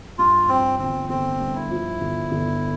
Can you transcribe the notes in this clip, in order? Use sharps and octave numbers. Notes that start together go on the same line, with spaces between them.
G2 F4
F3 C4
G1 C4
G1 C4
G2
E4
F3
G1
G1